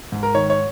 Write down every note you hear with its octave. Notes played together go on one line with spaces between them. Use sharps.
G#2
A#4
D#3 C#5
C#5